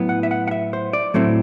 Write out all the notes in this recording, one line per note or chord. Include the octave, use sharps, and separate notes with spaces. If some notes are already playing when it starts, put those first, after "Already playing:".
Already playing: A2 F#3 B3 E4
F#5
E5
F#5
F#5
E5
C5
D5
A2 F#3 A3 C4 E4